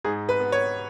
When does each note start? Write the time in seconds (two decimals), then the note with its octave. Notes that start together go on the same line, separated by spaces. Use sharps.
0.04 G#2 G#4
0.29 B4
0.40 B3
0.52 C#5